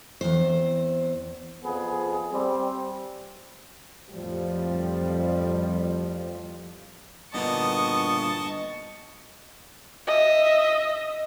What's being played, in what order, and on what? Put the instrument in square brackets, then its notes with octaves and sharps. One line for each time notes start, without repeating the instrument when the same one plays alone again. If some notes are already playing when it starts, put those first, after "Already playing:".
[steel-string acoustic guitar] E2 C4 C5
[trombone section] F2 B3 G#4
G3 C4
[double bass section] F2 A2 F3 G3
[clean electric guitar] G2 A#2 D3 [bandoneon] B3 [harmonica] D#5 [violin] A5 C#6
[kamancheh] D#5 E5